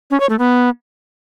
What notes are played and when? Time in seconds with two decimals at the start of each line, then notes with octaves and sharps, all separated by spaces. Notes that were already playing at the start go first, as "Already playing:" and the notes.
0.11 C#4
0.20 C#5
0.30 A3
0.39 B3